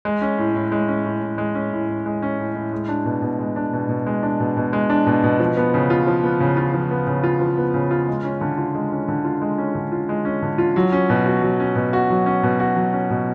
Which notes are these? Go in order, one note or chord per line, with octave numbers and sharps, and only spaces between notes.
G#3
C#4
A2
A2
G#3
C#4
A2
A2
G#3
C#4
A2
A2
G#3
C#4
A2
A2
G#3
D4
B2
B2
G#3
D4
B2
B2
G#3
D4
B2
B2
G#3
D4
B2
B2
F3
B3
C#3
F4
F3
B3
C#3
F4
F3
B3
C#3
F4
F3
B3
C#3
F4
G#3
C#4
D3
F4
G#3
C#4
D3
F4
G#3
C#4
D3
F4
G#3
C#4
D3
F4
F#3
C#4
B2
F#4
F#3
C#4
B2
F#4
F#3
C#4
B2
F#4
F#3
C#4
B2